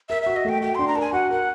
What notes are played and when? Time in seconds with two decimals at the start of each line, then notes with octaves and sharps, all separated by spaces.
0.09 A#4 E5
0.22 F#4 E5
0.36 D#5
0.45 A3 G5
0.61 F#4 G5
0.75 D4 C6
0.88 A#5
0.95 A#4 A5
1.01 G#5
1.13 F#4 F#5
1.30 A#4 F#5